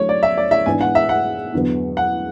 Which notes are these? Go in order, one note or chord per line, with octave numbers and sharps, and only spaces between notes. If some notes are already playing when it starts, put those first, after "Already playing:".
Already playing: D3 F#3 A3 E4 C#5
D5
E5
D5
E5
G#2 E3 B3 D4 G#5
F#5
E5
F#5
E2 D3 F#3 B3
F#5